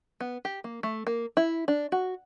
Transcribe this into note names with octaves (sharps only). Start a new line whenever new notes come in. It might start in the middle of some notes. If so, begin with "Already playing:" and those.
B3
G4
A#3
A3
A#3
E4
D4
F#4